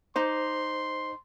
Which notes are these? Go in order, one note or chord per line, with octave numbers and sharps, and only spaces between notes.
D#4 C5 C6 D6